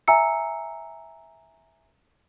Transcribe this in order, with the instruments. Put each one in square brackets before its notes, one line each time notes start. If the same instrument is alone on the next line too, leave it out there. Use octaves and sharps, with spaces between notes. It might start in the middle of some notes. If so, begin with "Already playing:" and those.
[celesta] E5 G#5 A#5 E6 C#7